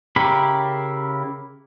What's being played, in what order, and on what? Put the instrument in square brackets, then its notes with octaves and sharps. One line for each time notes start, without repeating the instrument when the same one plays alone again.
[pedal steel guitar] C#3 E4 G4 A#4 B5